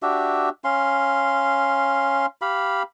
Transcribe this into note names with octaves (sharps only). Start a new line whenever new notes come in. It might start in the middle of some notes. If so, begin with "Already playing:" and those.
D4 F#4 G4 E5
C#4 F5 C6
G4 F5 B5